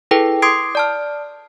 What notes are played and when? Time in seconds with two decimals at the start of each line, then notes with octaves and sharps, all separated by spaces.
0.11 E4 G#4 A4 B4 G5
0.42 C6 D6 D#6 G#6 C7 D7
0.75 D5 A5 F6